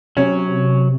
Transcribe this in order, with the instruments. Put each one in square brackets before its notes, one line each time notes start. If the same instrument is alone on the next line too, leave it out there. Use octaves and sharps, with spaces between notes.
[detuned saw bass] C3 [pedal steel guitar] F#3 [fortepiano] C#4